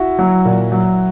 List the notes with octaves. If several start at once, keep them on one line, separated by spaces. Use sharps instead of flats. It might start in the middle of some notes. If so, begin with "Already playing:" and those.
Already playing: E4 F#4
F#3
A#2
F#3